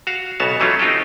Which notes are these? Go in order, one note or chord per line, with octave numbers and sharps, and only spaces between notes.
F#4 F5
B1 C#3 B3 F#4 C#5 A5
E3 F#3 A3 C#4 E4 F4
C4 D#4 F4 G4 A4